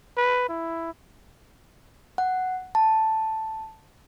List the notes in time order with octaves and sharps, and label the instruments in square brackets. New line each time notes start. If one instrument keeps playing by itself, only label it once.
[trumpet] B4
E4
[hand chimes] F#5
A5